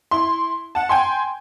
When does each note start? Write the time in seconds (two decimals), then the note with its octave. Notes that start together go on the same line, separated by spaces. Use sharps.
0.11 E4 C6
0.75 F#5 A5
0.89 G5 G#5 C6